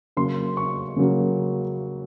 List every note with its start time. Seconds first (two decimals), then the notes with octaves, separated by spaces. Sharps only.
0.17 C#3 F#3 A#3 C6
0.57 C#6
0.96 C#3 F#3 A#3